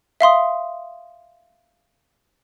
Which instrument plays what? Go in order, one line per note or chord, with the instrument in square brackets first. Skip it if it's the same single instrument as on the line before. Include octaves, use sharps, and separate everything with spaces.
[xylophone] E5 F5 C6 D#6